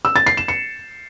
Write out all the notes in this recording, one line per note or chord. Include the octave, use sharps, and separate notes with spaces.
E6
A6
C7
E7
C#7